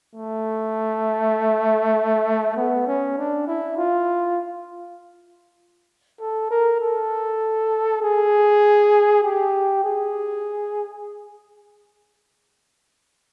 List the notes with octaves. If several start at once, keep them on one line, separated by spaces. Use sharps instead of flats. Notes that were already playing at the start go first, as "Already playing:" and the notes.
A3
B3
C#4
D4
E4
F4
A4
A#4
A4
G#4
G4
G#4